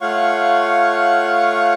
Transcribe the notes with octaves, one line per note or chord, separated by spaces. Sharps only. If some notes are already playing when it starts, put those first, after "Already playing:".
A3 F4 C#5 F5 F#5 C#6